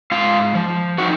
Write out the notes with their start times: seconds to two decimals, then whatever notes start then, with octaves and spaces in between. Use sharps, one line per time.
0.11 G#2 F4 F5
0.55 F3
0.98 D#4 F#4 F#5